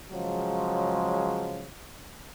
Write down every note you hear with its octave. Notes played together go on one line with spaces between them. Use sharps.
C#3 F3 F#3 G#3